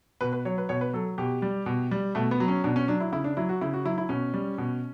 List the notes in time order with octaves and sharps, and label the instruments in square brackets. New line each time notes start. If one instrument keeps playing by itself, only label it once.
[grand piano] B2 B4
B4
F#3 C#5
B4
B2 C#5
B4
F#3 A4
B2 G4
G3
B2
G3
B2 A3
B3
F#3
C#4
B2 D4
C#4
F#3 D4
E4
C#3 E4
D4
F#3 E4
F#4
C#3 E4
F#4
F#3 E4
E4
B2 C#4
G3
B2